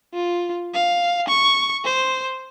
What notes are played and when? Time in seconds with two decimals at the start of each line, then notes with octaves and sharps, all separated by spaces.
0.14 F4
0.74 F5
1.28 C#6
1.85 C5